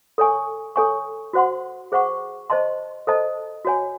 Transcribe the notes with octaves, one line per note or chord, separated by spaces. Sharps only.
A4 C#5 G#5 C#6
A4 C#5 G#5 C#6
F#4 C5 F#5 C6
G#4 C5 F#5 C#6
C5 D#5 A5 C6
A4 C5 D#5 A5
F#4 C#5 G#5